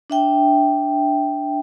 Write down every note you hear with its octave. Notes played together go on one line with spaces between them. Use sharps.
D4 E5 G5